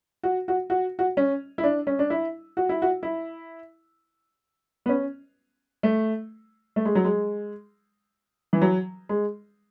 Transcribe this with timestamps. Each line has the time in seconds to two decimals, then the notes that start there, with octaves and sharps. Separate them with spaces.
0.23 F#4
0.48 F#4
0.70 F#4
0.99 F#4
1.17 C#4
1.58 E4
1.64 D4
1.87 C#4
1.99 D4
2.10 E4
2.57 F#4
2.69 E4
2.82 F#4
3.03 E4
4.86 B3
4.89 C#4
5.83 A3
6.76 A3
6.85 G#3
6.95 F#3
7.04 G#3
8.53 E3
8.62 F#3
9.09 G#3